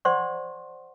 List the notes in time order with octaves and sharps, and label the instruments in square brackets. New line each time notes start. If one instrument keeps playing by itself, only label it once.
[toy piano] C5 D5 F#5 C6 C#6